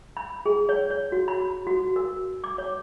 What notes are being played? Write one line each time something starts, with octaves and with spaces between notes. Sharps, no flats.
B5
G#4
C#5
C#5
F#4
B5
F#4
A#4
D6
C#5